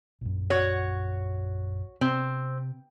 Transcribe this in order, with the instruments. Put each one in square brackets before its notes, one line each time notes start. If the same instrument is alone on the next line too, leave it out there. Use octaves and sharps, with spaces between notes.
[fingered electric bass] A#1 F#2
[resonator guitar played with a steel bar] F#4 C#5
[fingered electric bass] C3 [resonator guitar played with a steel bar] C4